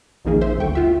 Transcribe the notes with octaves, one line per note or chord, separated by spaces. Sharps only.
A#1 F2 D#3 A#3 G#4
C5 E5
G1 D2 A4 G5 C#6
F4 E5 F#5